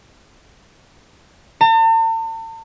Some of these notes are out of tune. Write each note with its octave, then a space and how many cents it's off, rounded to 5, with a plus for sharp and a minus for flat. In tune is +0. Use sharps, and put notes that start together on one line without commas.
A5 +45